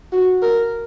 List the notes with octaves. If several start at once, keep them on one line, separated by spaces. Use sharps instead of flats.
F#4
A#4